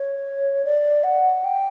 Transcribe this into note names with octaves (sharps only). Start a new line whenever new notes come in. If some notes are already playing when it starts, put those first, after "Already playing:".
Already playing: C#5
D5
F#5
G5